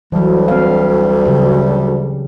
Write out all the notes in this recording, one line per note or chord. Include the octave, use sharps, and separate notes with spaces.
D2 E3 F#3 G3
C4 F5
C#3 F#3 G4